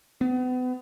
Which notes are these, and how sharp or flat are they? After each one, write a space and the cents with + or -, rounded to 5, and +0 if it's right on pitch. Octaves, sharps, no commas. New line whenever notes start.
B3 +35